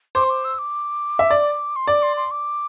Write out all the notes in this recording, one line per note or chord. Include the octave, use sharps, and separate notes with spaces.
C5 D6
C6
D6
E6
D6
E5
D5
C6
D5 D6
C6
C6
D6